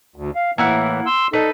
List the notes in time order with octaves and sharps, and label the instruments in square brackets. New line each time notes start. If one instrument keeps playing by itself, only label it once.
[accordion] D2
F5
[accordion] A2 E3 [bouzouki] A#3 E4 F#5
[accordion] C6 E6
[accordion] D#4 A4 [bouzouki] B4